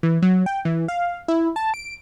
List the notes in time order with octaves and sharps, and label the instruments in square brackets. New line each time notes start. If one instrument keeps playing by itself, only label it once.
[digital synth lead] E3
F#3
G5
E3
F5
E4
A5
D7